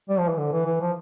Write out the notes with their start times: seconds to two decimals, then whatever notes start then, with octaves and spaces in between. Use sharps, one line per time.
0.09 G3
0.19 F3
0.29 E3
0.37 D3
0.52 E3
0.66 E3
0.81 F3